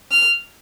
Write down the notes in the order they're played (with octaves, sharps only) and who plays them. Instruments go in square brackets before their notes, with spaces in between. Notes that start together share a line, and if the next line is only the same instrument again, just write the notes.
[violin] F6